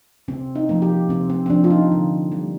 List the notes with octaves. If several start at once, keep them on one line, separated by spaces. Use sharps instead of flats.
C3 C4
D#4
F3 A#3
G4
C3 C4
C4
C4
F3 A#3 D4
F4
D#4
D3
G3 A#3